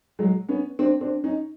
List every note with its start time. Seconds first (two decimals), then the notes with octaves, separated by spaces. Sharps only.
0.19 F#3 G#3
0.49 B3 C#4
0.79 C4 D4
1.01 C4 D4
1.24 C#4 D#4